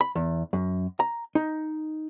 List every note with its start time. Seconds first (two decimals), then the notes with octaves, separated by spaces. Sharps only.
0.01 B5
0.15 E2
0.53 F#2
1.00 A#5
1.35 D#4